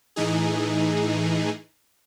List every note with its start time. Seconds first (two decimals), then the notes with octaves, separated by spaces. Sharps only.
0.16 A2 E3 D#4 G#4